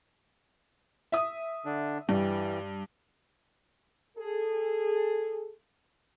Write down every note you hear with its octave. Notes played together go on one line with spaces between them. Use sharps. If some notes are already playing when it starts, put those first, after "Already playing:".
E5 D#6
D3 D4
G2 E3 G3
G#4 A4